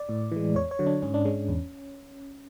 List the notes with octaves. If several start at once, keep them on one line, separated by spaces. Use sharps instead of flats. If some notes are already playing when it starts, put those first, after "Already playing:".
Already playing: D5
A2
E3 G#3
E2 C#5
C#5
D3 F#3
D4
G#2 C#4
D4
G#3 C#4
E2